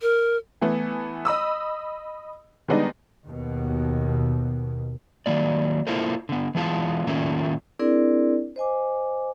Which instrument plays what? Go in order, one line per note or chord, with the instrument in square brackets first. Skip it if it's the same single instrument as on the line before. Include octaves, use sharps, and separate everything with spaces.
[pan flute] A#4
[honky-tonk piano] E3 A3 B3
D#5 B5 D#6 E6
D#3 G3 G#3 B3 D4 D#4
[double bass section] D#2 B2
[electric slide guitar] D#3 F#3 A#3 D5
A#3 E4 F4 A4 A#4 C5
D3 B3
E3 G#3 B3 F4 G5 A5
A2 D#3 A3 A#3 C#4 F4
[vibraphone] C4 D4 E4 G#4 A#4 D5
C5 D#5 G#5 D6